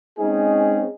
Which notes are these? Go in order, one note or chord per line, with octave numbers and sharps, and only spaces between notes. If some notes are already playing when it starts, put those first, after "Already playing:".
G#3 C4 C#4 D#4 G#4